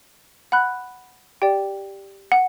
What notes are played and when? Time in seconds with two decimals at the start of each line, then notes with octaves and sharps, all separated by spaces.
0.52 F#5 B5 F#6
1.42 G4 D5 G5
2.32 F#5